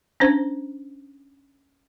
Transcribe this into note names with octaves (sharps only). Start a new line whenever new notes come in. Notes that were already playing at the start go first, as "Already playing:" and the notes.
C#4 D4 C5